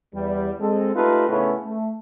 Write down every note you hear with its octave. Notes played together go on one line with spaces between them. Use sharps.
E2 G3
G#3 C4 A4
A3 D#4 F4 G4 A4 B4
A2 C#3 A3 B3 C#4 E4
A3